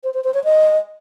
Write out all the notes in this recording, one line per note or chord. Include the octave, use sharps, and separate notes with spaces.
C5
C5
C5
C#5
D#5